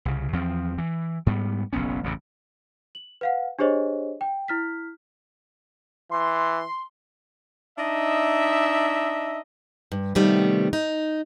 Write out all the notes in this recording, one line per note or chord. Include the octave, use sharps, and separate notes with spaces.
C2 C#3
E2 F3 C4
E3
G#2 G3 B3
F#1 B1 B3 C#4
A1 F2 C#3
F#7
B4 F5 F#5
D4 G4 G#4 C5 C#5 D#5
G5
E4 F6 B6
E3 C6
D4 D#4 D#5 E5
G2
C3 D#3 G3 A3 B3
D#4